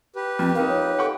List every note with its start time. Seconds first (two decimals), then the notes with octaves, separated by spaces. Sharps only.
0.15 G4 B4
0.39 F2 C4
0.55 D#4 F4 A#4
0.68 C#5
0.99 A4 F#5 G5 C#6